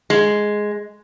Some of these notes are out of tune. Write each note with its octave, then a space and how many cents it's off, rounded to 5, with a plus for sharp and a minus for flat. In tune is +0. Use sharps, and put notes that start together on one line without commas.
G#3 +5